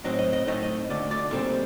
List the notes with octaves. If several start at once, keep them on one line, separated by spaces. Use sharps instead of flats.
A2 F#3 C4 D#4 D#5
D#5
D#5
A2 A3 C4 D#4 D#5
D#5
D2 D3 A3 D5
D5
A#2 G3 C4 D#4 A4